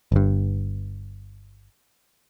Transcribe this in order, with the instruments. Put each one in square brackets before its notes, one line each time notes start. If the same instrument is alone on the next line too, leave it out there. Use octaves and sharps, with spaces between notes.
[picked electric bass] G1 G2